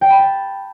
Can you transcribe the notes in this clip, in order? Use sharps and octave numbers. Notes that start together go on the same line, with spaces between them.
G5
B5
A5